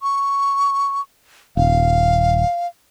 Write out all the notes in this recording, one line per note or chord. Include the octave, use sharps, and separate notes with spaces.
C#6
D#1 F5